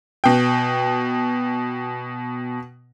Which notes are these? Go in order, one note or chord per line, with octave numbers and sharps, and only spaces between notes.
B2 G5